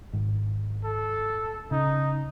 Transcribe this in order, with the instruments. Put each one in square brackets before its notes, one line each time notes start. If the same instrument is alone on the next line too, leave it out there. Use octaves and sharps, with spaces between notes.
[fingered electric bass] G#1
[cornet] A4
[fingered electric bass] C#3 [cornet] D#4